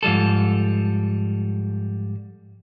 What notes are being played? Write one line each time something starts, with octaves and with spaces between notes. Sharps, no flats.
G#2 F3 G3 A4